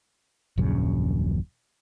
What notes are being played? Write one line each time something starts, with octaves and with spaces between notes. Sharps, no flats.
D#1 A#1 F#2 C#3